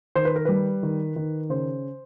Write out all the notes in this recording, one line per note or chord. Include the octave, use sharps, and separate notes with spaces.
D#3 C5
B4
A#4
G3 B4
D#3
D#3
C#3 C5